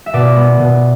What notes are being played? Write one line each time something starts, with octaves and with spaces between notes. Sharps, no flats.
E5
B2 D5
B3
B2